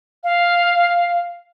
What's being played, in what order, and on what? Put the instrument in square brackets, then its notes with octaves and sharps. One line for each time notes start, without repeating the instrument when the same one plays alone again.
[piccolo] F5